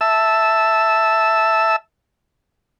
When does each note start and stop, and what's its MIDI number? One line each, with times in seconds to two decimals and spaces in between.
0.01 1.76 76
0.01 1.76 81
0.01 1.76 88